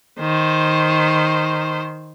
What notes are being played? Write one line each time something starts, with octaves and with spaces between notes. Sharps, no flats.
D#3 C5